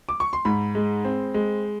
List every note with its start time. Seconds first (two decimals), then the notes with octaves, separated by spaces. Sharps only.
0.09 D6
0.20 C#6
0.33 C6
0.45 G#2 B5
0.75 G#3
1.05 C4
1.34 G#3